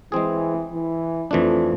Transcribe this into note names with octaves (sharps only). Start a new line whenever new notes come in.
E3 G#3 C4 G#4
E3
F2 E3 F3 A3 D4